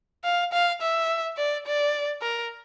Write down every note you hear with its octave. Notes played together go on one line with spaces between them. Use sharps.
F5
F5
E5
D5
D5
A#4